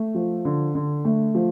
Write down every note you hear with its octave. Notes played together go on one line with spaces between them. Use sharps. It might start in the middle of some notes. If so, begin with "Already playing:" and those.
Already playing: A3
F3
D3
D3
A3
F3